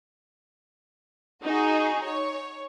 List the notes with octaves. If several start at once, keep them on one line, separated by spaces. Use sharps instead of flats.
D#4 F#4 G#4
C#5